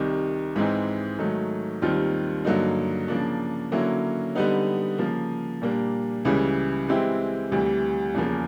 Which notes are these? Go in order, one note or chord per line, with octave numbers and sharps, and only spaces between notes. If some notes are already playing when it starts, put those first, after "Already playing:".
Already playing: C2 C3 D#3
G#2 E3 G#3 C4 D#4
G#2 D#3 F#3 A3
D#2 D#3 G3 C4 F4
G2 D3 F#3 A#3 D#4
C#3 F3 A#3 D4
D3 F#3 A#3 C#4 E4
D3 G3 B3 D#4
C#3 F3 A#3
A#2 G3 A#3 D4
C#2 C#3 E3 G3
E3 G#3 C4 E4 G4
D2 C3 E3 G3
E2 C#3 F3 A#3